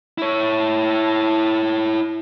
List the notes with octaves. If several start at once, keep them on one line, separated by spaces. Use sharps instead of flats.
E4 C#5